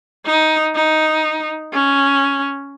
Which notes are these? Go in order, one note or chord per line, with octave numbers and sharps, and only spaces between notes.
D#4
D#4
C#4